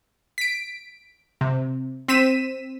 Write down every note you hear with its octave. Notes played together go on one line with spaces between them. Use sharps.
B6 D7
C3
C4 B6 D#7 E7